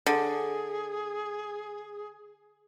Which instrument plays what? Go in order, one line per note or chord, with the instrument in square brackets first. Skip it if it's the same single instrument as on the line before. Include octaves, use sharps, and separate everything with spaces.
[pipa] D3 [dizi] G#4